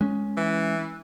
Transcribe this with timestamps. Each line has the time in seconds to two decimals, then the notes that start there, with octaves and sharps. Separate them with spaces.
0.01 G#3 C#4
0.37 E3